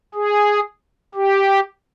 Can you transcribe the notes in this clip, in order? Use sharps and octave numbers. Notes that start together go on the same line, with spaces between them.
G#4
G4